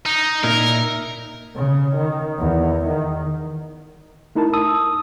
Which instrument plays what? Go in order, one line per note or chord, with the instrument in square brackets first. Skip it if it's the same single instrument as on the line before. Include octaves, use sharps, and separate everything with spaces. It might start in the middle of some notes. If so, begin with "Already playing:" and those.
[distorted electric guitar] D#4
[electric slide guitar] A#2 D#4 E4 [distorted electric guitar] A#4
[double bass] C#3
D#3
E2
D#3
[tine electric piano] A3 D#4 E4 A#4 A5
A5 D#6 E6